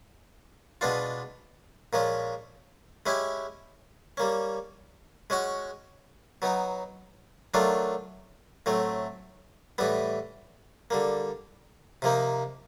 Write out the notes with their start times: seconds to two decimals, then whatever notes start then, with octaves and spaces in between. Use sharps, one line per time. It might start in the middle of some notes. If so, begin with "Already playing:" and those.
0.81 B2 G#3 B3 D4 F4
1.93 A#2 F3 G#3 C#4
3.06 G#3 C#4 E4 G4
4.17 G3 A#3 C#4
5.30 G#3 C#4 F#4
6.42 F#3 B3 D#4
7.54 D#3 F#3 A3 D4 F4
8.66 A2 F#3 A3 C4
9.78 A2 E3 G3 B3
10.90 D3 G3 A#3
12.02 C3 F3 A#3 D#4